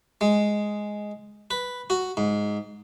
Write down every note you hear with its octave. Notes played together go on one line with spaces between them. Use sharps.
G#3
B4
F#4
G#2